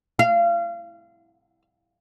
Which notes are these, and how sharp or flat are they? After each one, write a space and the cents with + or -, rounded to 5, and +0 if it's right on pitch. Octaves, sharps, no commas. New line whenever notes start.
F5 -30